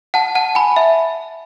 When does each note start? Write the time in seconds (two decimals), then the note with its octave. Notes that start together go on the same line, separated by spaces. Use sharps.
0.14 F#5 A5
0.35 F#5 A5
0.55 G#5 B5
0.76 E5